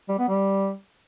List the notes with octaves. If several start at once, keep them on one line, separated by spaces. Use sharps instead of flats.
G3
B3
G3